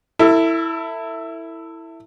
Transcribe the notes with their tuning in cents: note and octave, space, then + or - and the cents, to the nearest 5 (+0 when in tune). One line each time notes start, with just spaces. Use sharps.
E4 +0 A4 +35